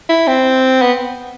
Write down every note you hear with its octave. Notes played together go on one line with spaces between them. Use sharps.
E4
C4
B3